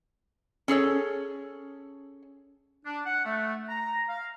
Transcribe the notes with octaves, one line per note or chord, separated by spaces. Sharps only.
C#4 G#4 A4 C#5
D4
F#5
A3
A#5
F5